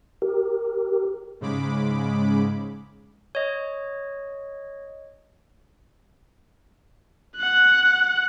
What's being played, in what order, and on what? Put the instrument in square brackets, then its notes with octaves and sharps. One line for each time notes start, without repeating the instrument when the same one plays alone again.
[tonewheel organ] G4 A#4
[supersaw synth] G#2 C#3 G#3 B5 D6
[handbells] C#5 D#5
[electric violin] F#5 F#6